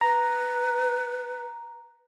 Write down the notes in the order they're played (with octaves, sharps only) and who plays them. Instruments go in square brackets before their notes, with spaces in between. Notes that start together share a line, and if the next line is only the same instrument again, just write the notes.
[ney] B4 [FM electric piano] A#5